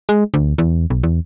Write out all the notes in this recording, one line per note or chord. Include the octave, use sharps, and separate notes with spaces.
G#3
D2
E2
B1
E2